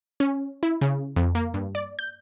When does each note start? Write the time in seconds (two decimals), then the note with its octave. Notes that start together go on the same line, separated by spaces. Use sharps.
0.20 C#4
0.63 E4
0.81 C#3
1.16 F2
1.35 A#3
1.54 G2
1.75 D5
1.99 G6